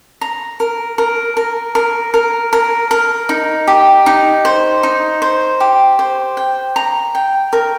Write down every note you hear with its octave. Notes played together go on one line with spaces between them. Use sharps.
A#5
A#4
A#4
A#4
A#4
A#4
A#4
A#4
D#4
G4
D#4
C5
D#4
C5
G4
C5
G5
A#5
G5
A#4